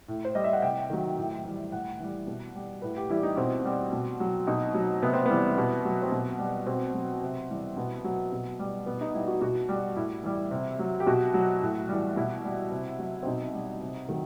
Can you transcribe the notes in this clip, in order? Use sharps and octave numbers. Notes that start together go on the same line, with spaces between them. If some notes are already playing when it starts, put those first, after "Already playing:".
A2
C5
G3 D#5
E5
F#5
C3 G5
D#3 F#3
A2
E3 G3
A2 F#5
E3 G3
B2
G3
A2 B4
G4
E3 G3 E4
D#4
B2 C4
G3
B2
F#3
B2 D#4
F#3
C3 B3
C4
E3 G3 B3
B2
F#3
C4
B2 B3
G3
B2 C4
F#3
C3
E3 G3
B2 B3
F#3
B2
G3
B2 B3
D#4
G3 E4
F#4
B2 F#4
G3
A2 E4
E3 G3
C3
F#3
G4
B2 F#4
F#3
A2
E3 G3
B2 E4
G3
C3
F#3
C4
B2 D#4
G3
C3
D#3 F#3